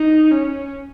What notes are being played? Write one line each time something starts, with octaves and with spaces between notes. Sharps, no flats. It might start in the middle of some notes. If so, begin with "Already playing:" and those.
Already playing: D#4
C#4